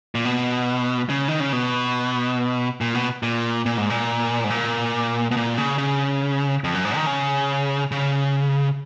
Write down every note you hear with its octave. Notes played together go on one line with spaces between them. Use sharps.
A#2
B2
C#3
D#3
C#3
B2
A#2
B2
A#2
A#2
G#2
A#2
G#2
A#2
B2
A#2
C#3
C#3
F2
F#2
G#2
D#3
C#3
C#3